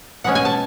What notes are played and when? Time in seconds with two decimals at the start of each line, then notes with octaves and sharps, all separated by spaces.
0.24 B2 G#3 C#4 F#5
0.35 G#5
0.45 A5